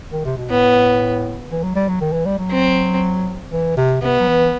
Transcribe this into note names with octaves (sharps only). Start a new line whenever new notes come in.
D#3
C3
B2
A2 B3
E3
F#3
G3
F#3
D#3
E3
G3
F#3
C4
E3
C3
C3 B3
F#3
E3